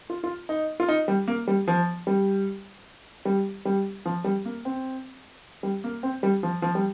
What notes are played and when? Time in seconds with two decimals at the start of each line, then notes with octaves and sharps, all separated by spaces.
0.10 F4
0.24 F4
0.49 D#4
0.80 F4
0.88 D#4
1.08 G3
1.28 A#3
1.48 G3
1.68 F3
2.07 G3
3.25 G3
3.65 G3
4.06 F3
4.24 G3
4.45 A#3
4.65 C4
5.63 G3
5.84 A#3
6.03 C4
6.23 G3
6.43 F3
6.62 F3
6.75 G3